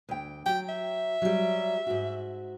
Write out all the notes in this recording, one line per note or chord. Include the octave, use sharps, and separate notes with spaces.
D2 G5
F#3 G5
E5
F#3 G3
G#2 F#4